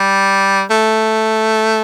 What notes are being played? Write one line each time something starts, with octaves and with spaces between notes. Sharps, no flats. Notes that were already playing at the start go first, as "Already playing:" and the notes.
Already playing: G3
A3